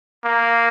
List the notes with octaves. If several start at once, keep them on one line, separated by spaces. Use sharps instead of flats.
A#3